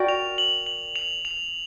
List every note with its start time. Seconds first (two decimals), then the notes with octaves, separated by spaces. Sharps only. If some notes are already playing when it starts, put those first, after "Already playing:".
Already playing: F#4 A#4 D5 G5
0.08 F7
0.38 F#7
0.66 F#7
0.96 F7
1.25 F7